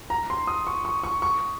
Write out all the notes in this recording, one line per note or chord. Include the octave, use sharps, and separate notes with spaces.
A#5
C6
D#6
C#6
C#6
C#6
C#6